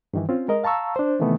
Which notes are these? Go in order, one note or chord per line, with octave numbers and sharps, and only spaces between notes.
G2 D#3 E3
C4 C#4 F4
G#3 A#4 D#5
F5 A5 A#5 C#6 E6
D4 C5
C3 D#3 E3 A3 B3